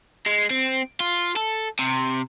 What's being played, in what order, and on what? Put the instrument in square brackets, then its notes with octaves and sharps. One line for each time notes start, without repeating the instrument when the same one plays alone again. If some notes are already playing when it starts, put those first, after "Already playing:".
[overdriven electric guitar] G#3
C4
F4
A4
C3